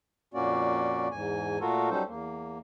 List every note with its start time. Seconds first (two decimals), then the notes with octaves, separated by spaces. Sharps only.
0.34 F2 A#2 A#3 C#4 F#4 D5
1.11 E2 G#2 G#5
1.61 A#2 A3 F4 F#4 A4 A#4
1.90 F#3 G3 C#4 D#4 A4 C5
2.08 E2 A#3